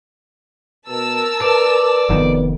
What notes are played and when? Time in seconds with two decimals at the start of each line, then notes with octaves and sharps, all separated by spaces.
0.88 B2 A#4 A5 E6
1.42 B4 D5
2.09 F1 F2 D#3 B3